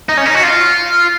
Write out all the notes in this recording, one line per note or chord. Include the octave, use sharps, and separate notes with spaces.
D#4
C#4
D#4
F#4
F4